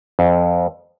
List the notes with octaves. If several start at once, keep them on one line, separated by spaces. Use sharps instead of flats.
F2